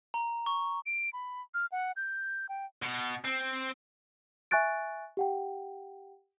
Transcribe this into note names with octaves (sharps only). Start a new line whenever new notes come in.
A#5
C#6
D7
B5
F6
F#5
G6
G5
B2
C4
E5 G#5 C#6 F#6 A6 D7
G4 F#5 G5